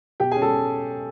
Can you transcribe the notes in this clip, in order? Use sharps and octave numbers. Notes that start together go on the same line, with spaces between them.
B2 G4 G5
C#4 G#4 G#5
A4 A5